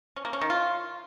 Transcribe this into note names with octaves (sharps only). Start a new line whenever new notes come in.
C#4
A#3
C#4
D#3
F4